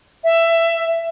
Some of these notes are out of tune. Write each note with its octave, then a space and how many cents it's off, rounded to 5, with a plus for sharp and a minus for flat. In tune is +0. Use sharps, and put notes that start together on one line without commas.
E5 +15